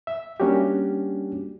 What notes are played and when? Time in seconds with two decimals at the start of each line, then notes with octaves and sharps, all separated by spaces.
0.07 E5
0.40 G3 A#3 C#4 D4 F#4 G4